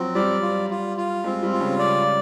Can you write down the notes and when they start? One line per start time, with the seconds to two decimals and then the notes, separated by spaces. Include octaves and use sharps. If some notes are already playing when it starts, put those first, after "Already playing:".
Already playing: F3 F#3 C4
0.15 G3 D5
0.42 F4
0.70 F4
0.97 F4
1.24 G#3 C4
1.43 G3
1.53 F4
1.61 C#3
1.79 D5